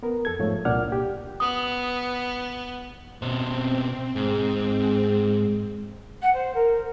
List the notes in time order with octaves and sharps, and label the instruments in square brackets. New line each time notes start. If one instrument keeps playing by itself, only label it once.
[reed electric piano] B3 A#4
F2 A4 G#6
G#2 F3 A3 C#5
C2 A#2 D4 D5 F#5 F6
G4
[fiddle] B3 [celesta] D#6
[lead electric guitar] B2 C5 [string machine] C4
[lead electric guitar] G#2 [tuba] G#3
[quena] F#5
C5
A#4